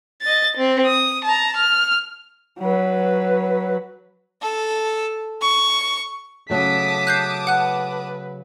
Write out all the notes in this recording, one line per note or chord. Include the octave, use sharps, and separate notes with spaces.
D#5 A6
C4
D#6
A5 A#5
F6
F#3 B4
A4
C#6
C#3 F#3 A3 A5 D6 D#6 B6
F#6 G6 C7
B4 F#5 F#6